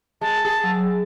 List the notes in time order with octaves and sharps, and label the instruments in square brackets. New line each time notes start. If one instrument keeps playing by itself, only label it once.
[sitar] G#3 [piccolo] A5
[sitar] G#4
[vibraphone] F#3 E6